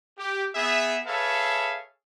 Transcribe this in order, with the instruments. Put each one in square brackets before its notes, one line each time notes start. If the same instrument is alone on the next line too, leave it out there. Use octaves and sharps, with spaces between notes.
[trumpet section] G4
B3 G#4 E5
G#4 A4 B4 C#5 E5 F5